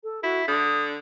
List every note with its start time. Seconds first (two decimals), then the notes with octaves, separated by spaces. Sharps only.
0.04 A4
0.23 E4 F#4
0.48 D3 D#6